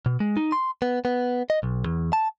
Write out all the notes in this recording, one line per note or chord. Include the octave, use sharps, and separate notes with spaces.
B2
G#3
D#4
C6
B3
B3
D#5
B1
E2
A5